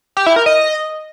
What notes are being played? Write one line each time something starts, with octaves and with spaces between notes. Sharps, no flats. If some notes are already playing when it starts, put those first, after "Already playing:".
G4
E4
A#4
D#5